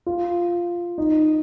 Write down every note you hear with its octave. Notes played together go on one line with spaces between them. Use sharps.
F4
D#4